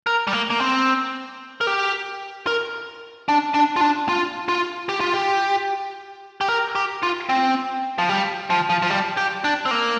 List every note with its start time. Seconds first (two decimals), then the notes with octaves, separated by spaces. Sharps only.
0.07 A#4
0.27 G3
0.33 A#3
0.50 A#3
0.60 C4
1.61 A#4
1.67 G4
2.47 A#4
3.29 D4
3.54 D4
3.76 F4
3.81 D4
4.09 F4
4.49 F4
4.89 G4
5.00 F4
5.14 G4
6.41 G4
6.49 A#4
6.75 G4
7.03 F4
7.29 C4
7.98 F3
8.09 G3
8.50 F3
8.70 F3
8.82 F3
8.90 G3
9.17 G4
9.44 D4
9.66 C4
9.71 A#3